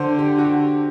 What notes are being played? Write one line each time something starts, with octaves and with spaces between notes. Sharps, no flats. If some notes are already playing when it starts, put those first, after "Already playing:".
Already playing: D3 C5
G4
F#4
G4